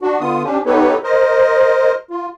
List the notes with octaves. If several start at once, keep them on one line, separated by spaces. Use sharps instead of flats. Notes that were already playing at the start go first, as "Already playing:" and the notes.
D4 F#4
D3 B3 F4 D#6
C#4 D4 G4
B3 D#4 G4 A4 B4 C#5
A#4 C5 D#5
F4